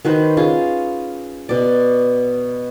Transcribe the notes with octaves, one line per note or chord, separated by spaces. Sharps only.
D#3 F#4 B4 C5
C#4 F4 G#4
B2 D5